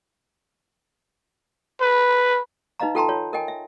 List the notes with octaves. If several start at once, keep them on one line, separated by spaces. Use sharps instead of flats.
B4
D#4 B4 D#5 F5 A#5
F4 A4 G5 A5 A#5 C6
F4 C#5
A#4 D#5 G5 G#5
E5